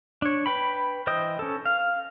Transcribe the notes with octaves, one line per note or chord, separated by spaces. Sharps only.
D4 C#5
B4 G5 B5
E3 C5 D#5 G5 D#6
C#4 A4
F5